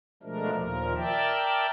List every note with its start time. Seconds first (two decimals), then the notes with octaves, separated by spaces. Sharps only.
0.23 B2 F3 G#3 A3 D4 A#4
0.54 D#2 A#2 F3 A#4
0.96 A#4 D5 E5 G5 A5